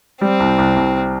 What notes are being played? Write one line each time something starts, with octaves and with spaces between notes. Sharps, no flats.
G3 C4
C2
C2
C2